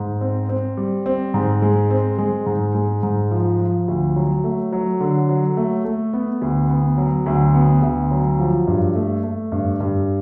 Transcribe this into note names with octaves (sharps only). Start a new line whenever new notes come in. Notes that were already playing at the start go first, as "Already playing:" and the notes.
Already playing: G#2
C4
C4
G3
C4
G#2
G#3
C4
G#3
G#2
G#3
G#2
F3
F3
D2
F#3
A3
F#3
D3
F#3
A3
A3
B3
D2
B3
F#3
D2
B3
D2
F#3
F3
G2
A3
A3
G2
G2